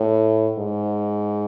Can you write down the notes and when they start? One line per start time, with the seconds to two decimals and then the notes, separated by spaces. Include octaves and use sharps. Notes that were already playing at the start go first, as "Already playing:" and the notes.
Already playing: A2
0.58 G#2